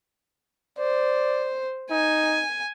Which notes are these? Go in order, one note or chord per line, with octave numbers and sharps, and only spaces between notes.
C5 D5
D#4 G#5